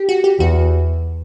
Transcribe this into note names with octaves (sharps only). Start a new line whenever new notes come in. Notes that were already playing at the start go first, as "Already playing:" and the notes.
Already playing: G4
F#4
G4
E2 F#4